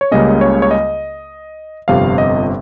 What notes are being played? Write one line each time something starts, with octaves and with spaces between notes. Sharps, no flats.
C#5
C#2 C#3 G3 A#3 C#4 D#5
C#5
C#5
D#5
G1 F2 C3 F5
D#5